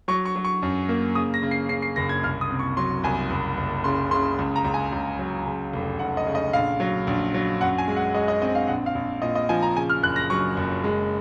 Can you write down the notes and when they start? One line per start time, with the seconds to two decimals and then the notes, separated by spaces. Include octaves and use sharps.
0.08 F#3 C#6
0.25 C#6
0.36 F#3
0.45 C#6
0.62 F#2
0.89 A#3
1.15 C#3 D#6
1.34 A#6
1.43 C#3
1.51 C7
1.69 C#3 C7
1.82 C7
1.96 F#1 A#6
2.09 G#6
2.23 C2 F6
2.41 D#6
2.51 C3
2.59 C#6
2.77 F#3 C6
3.04 C2 G#5
3.30 F#1
3.57 F#1
3.84 C#3 C6
4.11 C#3 C6
4.39 C#2
4.56 A#5
4.65 C#2
4.74 G#5
4.92 C#2
5.19 F#3
5.46 C#3
5.73 F1
5.99 F1 F#5
6.17 D#5
6.27 C#3
6.35 D#5
6.53 A#1 F5
6.80 F#3
7.07 A#1
7.34 F#3
7.61 F#2 F#5
7.78 G#5
7.88 G#3
7.96 F#5
8.15 G#3 D#5
8.28 D#5
8.42 C4 D#5
8.55 F5
8.68 A#1 F#5
8.86 F5
8.95 A#1
9.22 A#2 D#5
9.35 D#5
9.49 F3 G#5
9.62 A#5
9.76 C#3 G#5
9.90 F6
10.03 F#1 F#6
10.16 A#6
10.30 F#3 C#6
10.57 F#1
10.84 G#3